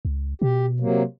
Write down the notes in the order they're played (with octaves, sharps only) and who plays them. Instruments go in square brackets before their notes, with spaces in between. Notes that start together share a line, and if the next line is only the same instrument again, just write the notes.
[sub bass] C#2
[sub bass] B2 [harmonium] G4
[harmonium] C3 F#3 A#3